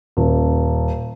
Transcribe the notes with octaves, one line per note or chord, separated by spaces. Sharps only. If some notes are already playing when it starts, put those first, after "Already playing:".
D#1